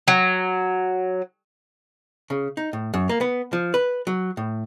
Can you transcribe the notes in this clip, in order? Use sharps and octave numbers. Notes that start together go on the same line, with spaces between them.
F#3
C#3
D#4
A2
F#2
A#3
B3
F3
B4
F#3
A2